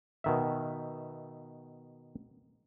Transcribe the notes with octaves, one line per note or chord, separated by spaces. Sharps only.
B2 D#3 E5